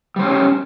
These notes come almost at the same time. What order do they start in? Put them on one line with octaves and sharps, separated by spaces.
G3 C5 C#4